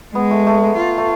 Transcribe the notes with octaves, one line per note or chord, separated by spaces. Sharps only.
G#3 B3
A3
A3
F4
A3